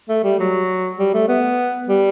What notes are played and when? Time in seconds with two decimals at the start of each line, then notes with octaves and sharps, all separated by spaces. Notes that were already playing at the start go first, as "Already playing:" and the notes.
0.09 A3
0.24 G3
0.39 F#3
0.99 G3
1.14 A3
1.28 B3
1.88 G3